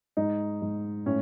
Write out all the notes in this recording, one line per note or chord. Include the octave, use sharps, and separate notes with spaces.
G#2 D#4
G#2
A2 C#4